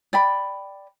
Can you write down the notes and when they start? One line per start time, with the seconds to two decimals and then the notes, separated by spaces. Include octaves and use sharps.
0.13 D5 G5 B5